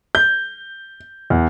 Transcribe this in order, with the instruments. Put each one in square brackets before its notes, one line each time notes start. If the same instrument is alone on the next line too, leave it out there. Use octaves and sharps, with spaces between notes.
[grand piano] G6
E2